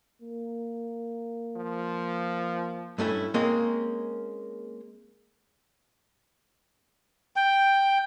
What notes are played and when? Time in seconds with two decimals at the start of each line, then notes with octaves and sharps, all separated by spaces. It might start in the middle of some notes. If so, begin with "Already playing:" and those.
0.22 A#3
1.56 F3
2.98 G2 A3 C#4 E4
3.34 G#3 A#3 C4 C#4
7.36 G5